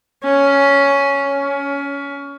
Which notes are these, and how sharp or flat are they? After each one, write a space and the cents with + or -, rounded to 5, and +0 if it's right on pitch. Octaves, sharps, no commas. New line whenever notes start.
C#4 +10
C#4 +20